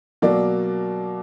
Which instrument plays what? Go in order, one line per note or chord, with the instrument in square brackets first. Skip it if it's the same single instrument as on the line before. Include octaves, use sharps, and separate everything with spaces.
[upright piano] B2 F#3 A#3 D5